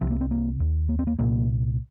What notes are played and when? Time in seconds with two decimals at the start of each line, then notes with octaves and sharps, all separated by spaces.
0.01 C2 C3 F3
0.10 A#3
0.21 C4
0.31 A#3
0.60 D#2
0.89 A#3
0.99 C4
1.07 A#3
1.19 C2 A#2 A#3